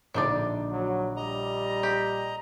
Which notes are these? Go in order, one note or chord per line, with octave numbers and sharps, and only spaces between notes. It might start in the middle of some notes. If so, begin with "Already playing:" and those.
A#1 D3 D4 D#4 D5 D6
F#3
G3 D#5 A#5
G4